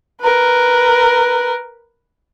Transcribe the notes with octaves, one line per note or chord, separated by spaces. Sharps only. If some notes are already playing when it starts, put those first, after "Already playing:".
A#4 B4